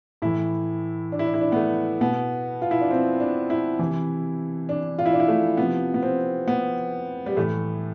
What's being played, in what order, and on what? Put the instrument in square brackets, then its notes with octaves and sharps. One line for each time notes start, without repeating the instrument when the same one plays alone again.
[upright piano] A2 E3 E4
D4
E4
D4
E4
D4
B3
A3
B2 B3
F4
E4
D4
C4
D4
E4
C3 E3
D4
F4
E4
D4
E4
A3
C3 F3 B3
B3
C4
B3
G3
A2 E3 A3